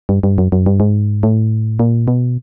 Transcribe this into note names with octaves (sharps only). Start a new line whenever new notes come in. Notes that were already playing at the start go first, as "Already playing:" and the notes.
G2
G2
F#2
F#2
G2
G#2
A2
A#2
B2